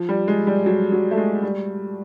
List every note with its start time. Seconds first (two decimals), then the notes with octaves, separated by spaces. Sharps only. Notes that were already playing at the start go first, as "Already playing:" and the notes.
Already playing: F3
0.09 G3
0.28 G#3
0.47 G3
0.66 F#3
0.92 F#3
1.11 A3
1.17 G#3
1.43 G3